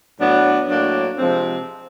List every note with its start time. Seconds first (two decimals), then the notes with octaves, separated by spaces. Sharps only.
0.19 A2 F#3 B3 D4
0.68 A2 F#3 A#3 D4
1.18 C3 F3 G#3 C4